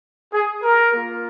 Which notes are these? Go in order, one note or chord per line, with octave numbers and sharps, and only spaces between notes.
G#4
A#4
A#3 F4